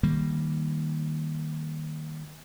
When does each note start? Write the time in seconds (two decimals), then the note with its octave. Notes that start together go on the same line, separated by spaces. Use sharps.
0.03 D#3 G3 A#3